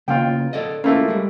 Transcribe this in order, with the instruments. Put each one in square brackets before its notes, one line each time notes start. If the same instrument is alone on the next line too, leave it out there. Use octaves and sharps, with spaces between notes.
[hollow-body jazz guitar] C#3 A#3 B3 [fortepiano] F4 G5
[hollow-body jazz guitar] A4 D5 D#5
[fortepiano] A3 A#3 [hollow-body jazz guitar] C#4 E4 F4
[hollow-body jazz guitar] G3 G#3